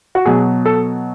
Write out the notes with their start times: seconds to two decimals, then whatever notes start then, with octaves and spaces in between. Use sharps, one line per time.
0.15 F#4
0.26 B2 F#3 G#4
0.66 A4